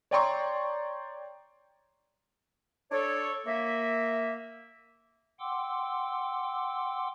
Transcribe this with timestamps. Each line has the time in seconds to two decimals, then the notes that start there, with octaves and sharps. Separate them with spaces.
0.11 C#5 D5 G5 A#5 C6 C#6
2.91 D4 A4 C#5
3.46 A#3 E5
5.40 F#5 G5 C6 D6 E6